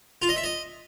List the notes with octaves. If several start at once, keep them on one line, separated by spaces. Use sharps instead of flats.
F4
D#5
E5
D#5